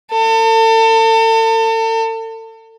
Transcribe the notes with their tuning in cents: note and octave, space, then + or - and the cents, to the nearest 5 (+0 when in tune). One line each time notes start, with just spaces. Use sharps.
A4 +40